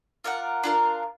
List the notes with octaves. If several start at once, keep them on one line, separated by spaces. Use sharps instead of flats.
F4 A#4 D5 F#5
D4 F4 A#4